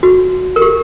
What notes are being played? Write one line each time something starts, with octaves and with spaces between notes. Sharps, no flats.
F#4
A#4
G4